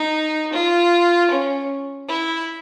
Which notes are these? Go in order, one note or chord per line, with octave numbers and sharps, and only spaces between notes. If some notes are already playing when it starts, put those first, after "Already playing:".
Already playing: D#4
F4
C#4
E4